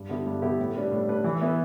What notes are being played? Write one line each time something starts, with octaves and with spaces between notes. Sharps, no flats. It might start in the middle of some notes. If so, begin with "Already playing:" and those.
Already playing: G2
D3 B3 E4 G4
G2
D3 B3 E4 G4
A2
G3 D4 B4
A2
G3 D4 B4
E3
B3 E4 B4